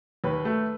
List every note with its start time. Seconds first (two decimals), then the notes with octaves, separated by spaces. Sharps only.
0.24 D#2 B4
0.45 A3